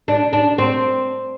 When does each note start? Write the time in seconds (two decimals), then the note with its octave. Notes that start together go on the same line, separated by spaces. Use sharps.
0.08 D4
0.33 D4
0.58 C4